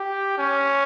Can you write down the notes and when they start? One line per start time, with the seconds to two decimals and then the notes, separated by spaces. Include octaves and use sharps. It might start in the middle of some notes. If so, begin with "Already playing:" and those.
Already playing: G4
0.38 C#4